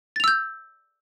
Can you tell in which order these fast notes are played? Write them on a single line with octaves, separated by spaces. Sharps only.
A6 F7 E6 G6